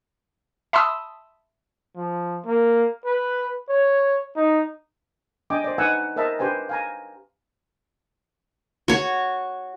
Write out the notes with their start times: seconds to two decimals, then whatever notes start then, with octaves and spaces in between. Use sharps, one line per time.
0.73 E5 A5 B5 C6 D#6 E6
1.96 F3
2.46 A#3
3.05 B4
3.69 C#5
4.36 D#4
5.50 D4 D#5 G5 G#5 D6
5.64 C5 D5
5.78 D#4 B4 F#5 G#5 E6
6.16 A#4 C5 D#5 E5 A5 A#5
6.39 D4 G4 B4 C5 G5 G#5
6.69 F5 G#5 A#5
8.88 F#4 C#5